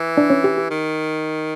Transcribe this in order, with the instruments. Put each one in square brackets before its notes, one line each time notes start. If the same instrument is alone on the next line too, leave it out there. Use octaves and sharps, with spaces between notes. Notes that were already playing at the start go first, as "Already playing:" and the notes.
Already playing: [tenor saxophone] E3
[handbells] D4 D5
C#4 C#5
G4
G4
[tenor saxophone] D#3